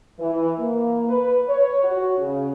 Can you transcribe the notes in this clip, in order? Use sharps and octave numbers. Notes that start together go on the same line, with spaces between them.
E3
A#3
B4
C#5
F#4
C#3